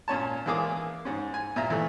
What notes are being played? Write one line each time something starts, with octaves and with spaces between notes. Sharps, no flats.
A#2 C#4 C#5 A5
E3 G#3 A#3 G#4 D6 D#6
G#2 C#4
G#5
A#2 E5 A#5
E3 A3